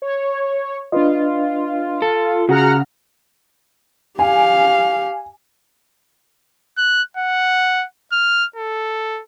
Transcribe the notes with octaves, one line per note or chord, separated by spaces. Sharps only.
C#5
D4 F4 B4 D#5
A4
C#3 F#4 G#4 F#5 A#5 F6
G4 F5 G#5
F#6
F#5
F6
A4